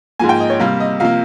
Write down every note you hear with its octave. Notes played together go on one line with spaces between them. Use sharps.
G#2 F3 A#3 G#5
G5
D#5
C#5
C3 G3 A#3 F5
D#5
C3 F3 A#3 F5